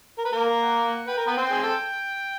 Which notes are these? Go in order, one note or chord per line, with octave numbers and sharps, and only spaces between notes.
A#4
B4
A#3 A#4
F#5
B4 G5
A#4
B3 B4
C4 C5
G#4
A4